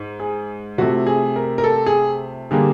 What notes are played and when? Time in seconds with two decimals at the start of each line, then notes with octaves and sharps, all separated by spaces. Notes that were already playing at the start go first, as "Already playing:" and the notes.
Already playing: G#2
0.20 G#4
0.78 C3 F3 A3 F#4
1.07 G#4
1.36 A#4
1.58 A#4
1.64 A4
1.86 G#4
2.51 D3 G3 A#3 G#4